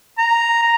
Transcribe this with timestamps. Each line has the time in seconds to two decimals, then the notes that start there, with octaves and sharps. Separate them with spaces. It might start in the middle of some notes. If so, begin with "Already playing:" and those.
0.18 A#5
0.62 A#5